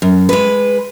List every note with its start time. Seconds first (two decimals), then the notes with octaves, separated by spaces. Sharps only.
0.02 F#2
0.29 G#3 B4